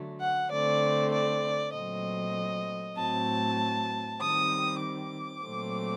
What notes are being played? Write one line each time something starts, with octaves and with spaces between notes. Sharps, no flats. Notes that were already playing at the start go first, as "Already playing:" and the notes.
Already playing: D3 F#3 A3
F#5
D3 A3 C4 D5
D5
A#2 F#3 A3 C4 D#5
A2 F#3 C4 A5
D#3 G3 C4 D#6
D6
A#2 F#3 A3 C4